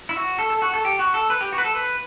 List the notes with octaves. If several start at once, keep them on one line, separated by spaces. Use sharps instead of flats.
E4
F#4
A4
A4
F#4
A4
G4
F#4
A4
B4
G4
F#4
B4
A4
B4